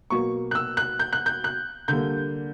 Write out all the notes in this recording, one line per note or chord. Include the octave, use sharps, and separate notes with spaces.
B2 F#3 A#3 C#6
F#6
E6
F#6
G6
F#6
G6
F#6
D3 G3 A#3 G6